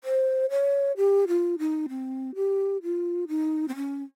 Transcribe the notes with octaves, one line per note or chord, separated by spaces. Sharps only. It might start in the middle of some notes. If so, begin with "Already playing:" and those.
C5
C#5
G4
F4
D#4
C4
G4
F4
D#4
C4
C#4